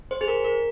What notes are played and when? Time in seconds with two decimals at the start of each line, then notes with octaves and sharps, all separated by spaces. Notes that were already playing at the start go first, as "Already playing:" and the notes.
0.11 C5
0.21 G#4
0.28 A#4
0.44 A#4